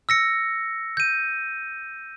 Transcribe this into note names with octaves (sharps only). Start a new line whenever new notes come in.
E6 A#6 C#7
G6 D#7